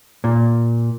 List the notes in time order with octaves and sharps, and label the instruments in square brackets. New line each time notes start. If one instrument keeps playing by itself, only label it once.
[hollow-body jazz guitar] A#2